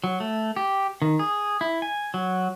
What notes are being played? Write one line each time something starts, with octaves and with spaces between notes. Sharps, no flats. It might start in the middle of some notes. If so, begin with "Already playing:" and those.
F#3
A3
G4
D#3
G#4
E4
G#5
F#3